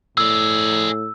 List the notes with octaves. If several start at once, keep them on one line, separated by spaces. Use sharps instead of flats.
A2 G#4 D5 E6